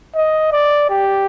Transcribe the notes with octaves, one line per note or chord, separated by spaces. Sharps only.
D#5
D5
G4